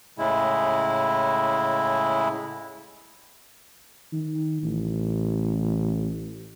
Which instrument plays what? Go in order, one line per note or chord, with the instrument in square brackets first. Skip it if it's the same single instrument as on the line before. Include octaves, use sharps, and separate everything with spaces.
[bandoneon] A2 C#3 G#3 E4
[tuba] D#3
A1